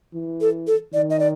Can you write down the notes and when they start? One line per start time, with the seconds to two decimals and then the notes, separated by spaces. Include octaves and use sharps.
0.14 E3
0.41 A4
0.67 A4
0.93 D#3 D5
1.10 D#5
1.20 D5